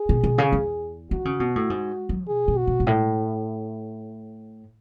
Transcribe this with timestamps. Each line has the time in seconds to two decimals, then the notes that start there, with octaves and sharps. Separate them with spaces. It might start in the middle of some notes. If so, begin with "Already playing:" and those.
Already playing: G#4
0.09 B2
0.24 B2
0.38 C#3
0.52 E2
1.11 D#3 F#4
1.25 C#3
1.40 B2
1.56 A2
1.70 G#2
2.09 F#3
2.28 B2 G#4
2.48 B2
2.58 F#4
2.67 B2
2.80 G#2
2.87 A2